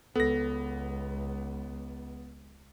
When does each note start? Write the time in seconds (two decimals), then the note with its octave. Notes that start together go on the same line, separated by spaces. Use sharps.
0.16 C#2 B3 A4 A#6